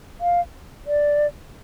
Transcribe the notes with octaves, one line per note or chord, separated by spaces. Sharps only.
F5
D5